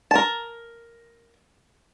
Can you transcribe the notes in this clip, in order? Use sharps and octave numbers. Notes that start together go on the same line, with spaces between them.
A#4 A5